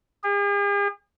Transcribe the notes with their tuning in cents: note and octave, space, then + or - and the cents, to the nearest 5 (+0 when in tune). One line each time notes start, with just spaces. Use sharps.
G#4 -45